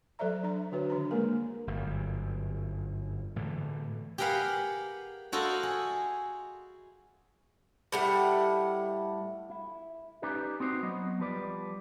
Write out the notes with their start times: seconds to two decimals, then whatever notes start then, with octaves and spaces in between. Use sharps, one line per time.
0.19 F#3 A4 C5 D5 E5 A#5
0.43 D4 A#5
0.72 D3 D4 F#4 B4 C#5
0.90 D#3 D4 A#5
1.11 G#3 A#3 G#4 A#4
1.67 G1 F#2
3.36 A2 D3 E3
4.18 G4 G#4 A#4 B4 F5 F#5
5.32 E4 F#4 A4 C5 D#5 F5
5.63 G#4
7.92 A2 G3 F#5
9.50 E4
10.22 C#4 D#4 G4 B4 D5
10.60 C4 D#4 F#4 C5
10.83 F#3 B3 D#5
11.19 F3 G3 B4 D5